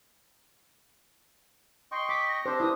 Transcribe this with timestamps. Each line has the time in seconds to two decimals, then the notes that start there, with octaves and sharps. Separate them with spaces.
1.92 D#5 G5 C6 C#6
2.09 D6 B6
2.29 A#6
2.46 C4 D4 G4 C5
2.60 E4 B4 D#6